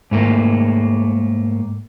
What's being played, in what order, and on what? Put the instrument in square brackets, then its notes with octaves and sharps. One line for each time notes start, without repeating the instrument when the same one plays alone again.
[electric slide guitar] G#2 A3 A#3